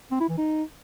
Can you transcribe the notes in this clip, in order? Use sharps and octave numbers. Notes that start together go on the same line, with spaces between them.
C4
E4
E3
D#4